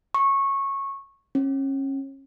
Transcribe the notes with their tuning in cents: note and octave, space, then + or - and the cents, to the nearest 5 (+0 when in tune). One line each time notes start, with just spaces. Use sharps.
C#6 -15
C#4 -30